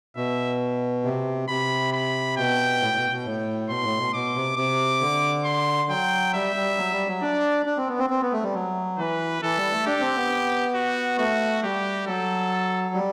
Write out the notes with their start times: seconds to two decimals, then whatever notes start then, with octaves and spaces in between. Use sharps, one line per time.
0.16 B2 E5
1.05 C3
1.48 C3 B5
1.93 B5
2.37 B2 G5
2.82 A2
2.96 B2
3.11 B2
3.25 A2
3.69 B2 C6
3.84 A2
3.98 B2
4.13 B2 D6
4.36 C3
4.57 C3 D6
5.01 D3
5.45 C6
5.89 F#3 G5
6.34 G3 E5
6.56 G3
6.77 F#3
6.92 G3
7.08 F#3
7.22 D4 D5
7.66 D4
7.77 C4
7.88 B3
7.99 C4
8.10 C4
8.22 B3
8.32 A3
8.43 G3
8.54 F#3
8.98 E3 B4
9.43 E3 A4
9.57 G3
9.72 A3
9.86 D4 G4
10.00 C4
10.16 B3
10.74 F#4
11.18 A3 F#4
11.63 G3 G4
12.07 F#3 A4
12.94 G3